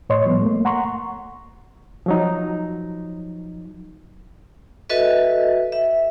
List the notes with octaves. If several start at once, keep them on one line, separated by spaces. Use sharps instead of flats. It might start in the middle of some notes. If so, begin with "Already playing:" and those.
A2 C#5 D#5 C6
F3 G3 B3
A3 A#3
F#5 A#5 C6 C#6
F3 F#3 D#4
F#4 A4 B4 D#5 E5
E5